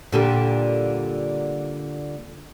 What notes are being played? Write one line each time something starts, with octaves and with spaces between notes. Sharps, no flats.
A#2 D3 G3